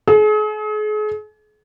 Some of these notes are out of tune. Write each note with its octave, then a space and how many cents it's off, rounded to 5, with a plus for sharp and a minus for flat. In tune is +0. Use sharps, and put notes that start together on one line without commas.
G#4 +40